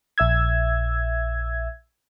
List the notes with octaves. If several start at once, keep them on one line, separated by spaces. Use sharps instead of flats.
A#1 E5 E6 G#6